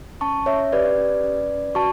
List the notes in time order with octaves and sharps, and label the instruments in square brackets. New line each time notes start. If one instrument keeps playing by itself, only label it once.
[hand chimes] C#4 A5 C#6
C#4 C#5 E5
G4 B4 D5
C#4
C#4
C#4
F#4 A5 C#6